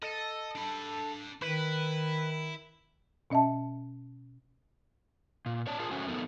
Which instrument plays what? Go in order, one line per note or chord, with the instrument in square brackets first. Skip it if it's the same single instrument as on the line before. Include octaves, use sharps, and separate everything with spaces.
[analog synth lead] A4 [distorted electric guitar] D#5
[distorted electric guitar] D4 B5
[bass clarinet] D#3 [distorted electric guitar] E4 [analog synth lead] B4
[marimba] B2 C#4 D#5 E5 A5
[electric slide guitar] A#2
C#5 D5 A5
F4 G#4 A#4 A5
A3 C#4 F#4 C5 G#5
F2 B3 D#4 A4 A#4